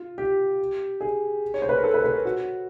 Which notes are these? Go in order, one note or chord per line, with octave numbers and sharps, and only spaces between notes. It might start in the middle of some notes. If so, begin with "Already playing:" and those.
Already playing: F4
G4
G#4
C#5
C5
B4
A#4
A4
B4
B4
A#4
F#4